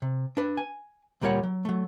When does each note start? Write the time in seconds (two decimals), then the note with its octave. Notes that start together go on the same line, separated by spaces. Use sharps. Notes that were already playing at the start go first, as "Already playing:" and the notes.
0.02 C3
0.37 D4 B4
0.57 G#5
1.21 D2 A#2 G3 A#4 C#5 F#5
1.43 F#3
1.65 F#3 A3